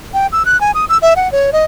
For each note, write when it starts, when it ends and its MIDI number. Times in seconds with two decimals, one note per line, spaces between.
0.14 0.27 79
0.32 0.45 88
0.46 0.60 90
0.61 0.71 80
0.74 0.85 87
0.89 0.98 88
1.02 1.14 76
1.16 1.31 78
1.32 1.51 73
1.53 1.65 75